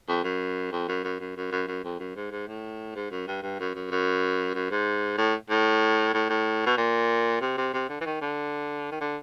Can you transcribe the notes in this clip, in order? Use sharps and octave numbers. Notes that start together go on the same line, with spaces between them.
F2
F#2
F2
F#2
F#2
F#2
F#2
F#2
F#2
F2
F#2
G#2
G#2
A2
G#2
F#2
G2
G2
F#2
F#2
F#2
F#2
G#2
A2
A2
A2
A2
B2
A#2
C3
C3
C3
D3
E3
D#3
D3
D#3
D3